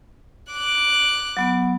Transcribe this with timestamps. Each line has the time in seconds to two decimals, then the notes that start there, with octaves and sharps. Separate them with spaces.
0.53 D6 F#6
1.37 F#3 B3